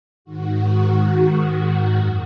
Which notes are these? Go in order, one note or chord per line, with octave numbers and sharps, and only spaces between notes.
G#2 D#3 F#4
F#2